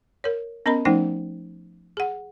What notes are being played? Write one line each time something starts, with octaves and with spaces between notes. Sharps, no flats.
A#4 C#5
B3 C#4 A#4 D#5 A#5 B5
F3 A3 C#4 D#4 C5 G5
G#4 F#5